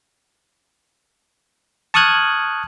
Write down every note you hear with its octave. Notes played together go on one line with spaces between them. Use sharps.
A5 C#6 D#6 F6 F#6 G#6